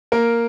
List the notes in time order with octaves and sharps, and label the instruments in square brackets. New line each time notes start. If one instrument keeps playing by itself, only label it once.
[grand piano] A#3 A#4